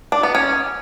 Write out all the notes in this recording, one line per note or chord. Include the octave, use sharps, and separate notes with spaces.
D4
B3
C#4